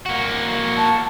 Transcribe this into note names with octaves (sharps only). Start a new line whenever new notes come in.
A#3 F#4
A5